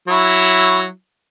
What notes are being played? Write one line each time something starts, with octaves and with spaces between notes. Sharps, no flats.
F#3 E4